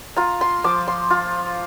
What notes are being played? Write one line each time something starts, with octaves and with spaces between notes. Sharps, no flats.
F4 A#5
C6
F3 D6
C6
F4